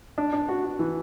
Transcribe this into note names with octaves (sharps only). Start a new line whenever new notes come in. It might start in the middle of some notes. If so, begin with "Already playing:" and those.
D4
D4
F#4
F#4
E3